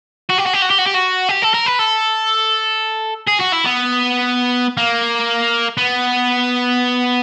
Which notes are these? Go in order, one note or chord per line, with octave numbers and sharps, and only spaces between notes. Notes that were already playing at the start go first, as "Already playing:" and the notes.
F#4
G4
F#4
G4
F#4
G4
F#4
G4
F#4
G4
A4
A#4
B4
A4
G#4
F#4
E4
B3
A#3
B3